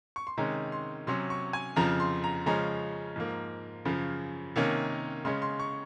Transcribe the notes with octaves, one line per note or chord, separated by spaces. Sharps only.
C#6
C6
C3 D#3 G#3 C#4 A#5
C6
C3 F#3 C#4 C6
C#6
G#5
F2 C#3 F3 A#5
C6
A#5
C#3 F3 G#3 C#4 A#5
G#2 F3 A#3
F#2 C#3 F3
C3 D#3 A#3 C#4
C#3 G#3 C#4 C6
C6
C#6